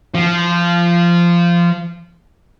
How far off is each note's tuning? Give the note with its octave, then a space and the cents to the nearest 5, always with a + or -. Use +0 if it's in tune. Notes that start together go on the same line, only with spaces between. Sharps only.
F3 -15